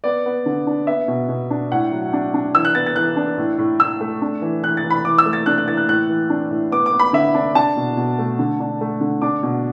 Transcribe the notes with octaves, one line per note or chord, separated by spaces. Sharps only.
B3 D5
B3
D3
D4
B3 E5
B2
B2
D4
A2 F#5
F#3
D4
D4
E3 E6
F#6
B3 A6
A6
E3 F#6
D4
A2
A2
A2 E6
A3
D4
E3
E3 F#6
A6
E3
B5
E3 D6
E6
A3
A6
D4 F#6
F#6
E3 A6
F#6
A2 F#6
E3
D4
A2
B3 D6
D6
B3
B5
D3 E5
D4
D4 A5
B2
B2
A3
D3
D4
A3
D3
D4 D6
B2